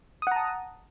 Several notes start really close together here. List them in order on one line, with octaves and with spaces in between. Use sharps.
D#6 F#5 A#5 A5